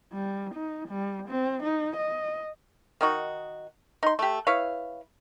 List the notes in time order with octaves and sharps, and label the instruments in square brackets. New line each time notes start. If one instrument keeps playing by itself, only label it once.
[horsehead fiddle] G3
D#4
G3
C4
D#4
D#5
[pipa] D#3 D#4 F#4
D#4 C6
A3 G4
E4 B4 C#5 F5